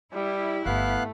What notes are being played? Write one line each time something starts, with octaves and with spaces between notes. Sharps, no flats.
G3 E4
G1 A3 B3 F5 F#6